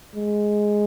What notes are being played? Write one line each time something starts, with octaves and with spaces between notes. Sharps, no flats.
G#3